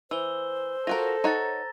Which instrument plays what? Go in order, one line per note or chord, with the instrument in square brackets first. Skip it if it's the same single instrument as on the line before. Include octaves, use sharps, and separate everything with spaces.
[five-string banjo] E3 [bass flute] C5 [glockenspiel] E6 G7
[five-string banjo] F4 F#4 A#4 [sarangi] A4 [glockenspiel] A#6
[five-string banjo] D#4 C#5 F#5 [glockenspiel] A#5 A6